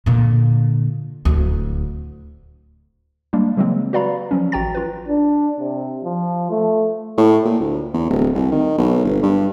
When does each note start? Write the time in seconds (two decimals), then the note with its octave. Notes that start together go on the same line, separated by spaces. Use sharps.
0.06 A#2 D3
1.25 D1 D2
3.33 G3 G#3 A#3 D4
3.57 C#3 E3 F#3 G#3 A#3 C4
3.93 F#4 B4 D5 F5 A#5 B5
4.31 F3 F#3 C#4
4.52 A1 F#4 G5 A#5 A6
4.75 F4 B4
5.08 D4
5.60 C3
6.04 F3
6.50 A3
7.17 A2
7.45 A#2
7.60 D2
7.93 E2
8.10 D1
8.34 C2
8.51 D#3
8.78 B1
9.04 G1
9.23 G2